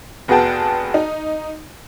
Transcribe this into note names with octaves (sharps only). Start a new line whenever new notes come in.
F1 B3 F#4 G#4 G5 A5
D#4